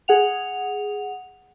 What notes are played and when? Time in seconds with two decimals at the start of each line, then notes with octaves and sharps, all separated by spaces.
0.08 G#4 F#5 F7